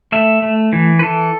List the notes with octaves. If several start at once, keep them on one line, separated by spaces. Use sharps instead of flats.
A3 E5
A3
E3
B4
E3 A4